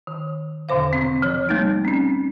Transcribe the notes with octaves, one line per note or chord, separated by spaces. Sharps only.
D#3
E2 B2 D3 C5 F5
C3 C4
F3 C#5
G3 A3 A#3 D#4
C4 C#4